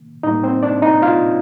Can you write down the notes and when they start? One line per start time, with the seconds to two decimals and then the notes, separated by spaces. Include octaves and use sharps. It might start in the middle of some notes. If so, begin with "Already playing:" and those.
Already playing: D#3 A#3
0.23 A2 G3 A#3 D#4 D#5
0.44 C4 C5
0.63 D4 D5
0.82 D#4 D#5
1.02 F4 F5